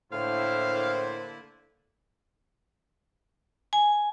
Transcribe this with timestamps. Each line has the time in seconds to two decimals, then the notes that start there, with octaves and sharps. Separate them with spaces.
0.12 A2 D3 A#3 E4 C5 F5
3.73 G#5